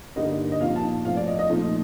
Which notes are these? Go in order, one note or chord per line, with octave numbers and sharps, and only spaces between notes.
G2 D3 G3 A#3 D#4 D#5
D#5
A#2 F3 C4 D#4 F5
A5
A2 F3 C4 F5
D5
D#5
D#5
A#2 F3 A3 C4 D#4